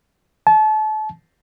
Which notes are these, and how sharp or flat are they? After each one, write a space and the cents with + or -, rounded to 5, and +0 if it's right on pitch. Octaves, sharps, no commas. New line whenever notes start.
A5 -30